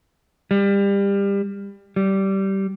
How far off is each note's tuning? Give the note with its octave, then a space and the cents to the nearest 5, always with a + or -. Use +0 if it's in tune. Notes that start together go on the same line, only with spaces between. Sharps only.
G3 +25
G3 -15